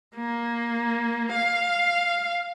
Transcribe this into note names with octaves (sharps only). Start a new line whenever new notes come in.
A#3
F5